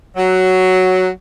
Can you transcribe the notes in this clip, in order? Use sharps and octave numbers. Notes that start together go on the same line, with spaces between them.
F#3